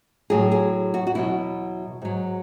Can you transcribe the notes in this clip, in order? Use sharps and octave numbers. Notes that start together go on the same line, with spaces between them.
A2 F#3 G#4
G#4
F#4
F#4
E2 B2 F#3 E4
G#2 F#3